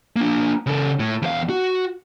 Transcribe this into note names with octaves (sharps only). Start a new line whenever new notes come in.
A#3 D4
C#3 A4
A2
E2 F5
F#4